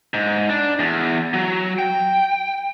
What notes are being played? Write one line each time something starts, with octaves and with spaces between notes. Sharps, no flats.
G#2
D4
E2
F#3
G5